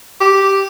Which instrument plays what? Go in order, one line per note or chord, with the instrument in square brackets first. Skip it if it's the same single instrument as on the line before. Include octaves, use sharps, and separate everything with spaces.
[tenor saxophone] G4